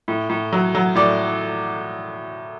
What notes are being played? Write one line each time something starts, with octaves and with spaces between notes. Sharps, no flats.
A2
A2
F#3
F#3
A2 D5